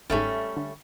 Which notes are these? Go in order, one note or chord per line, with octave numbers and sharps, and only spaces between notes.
G1 G#2 G3 A3 C#4
D3